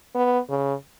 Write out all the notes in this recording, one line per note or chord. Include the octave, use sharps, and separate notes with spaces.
B3
C#3